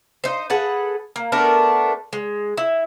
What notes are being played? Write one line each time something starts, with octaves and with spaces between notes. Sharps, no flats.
D#4 C5
G#4 A4 B4 F#5
A#3
A3 B3 D4 A#4
G#3
E4